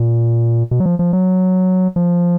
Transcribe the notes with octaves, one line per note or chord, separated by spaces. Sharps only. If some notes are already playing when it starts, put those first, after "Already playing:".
Already playing: A#2
B2
F#3
F3
F3
F#3
F3